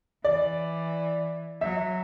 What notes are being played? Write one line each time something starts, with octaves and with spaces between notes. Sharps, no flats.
E3 D5
F#3 E5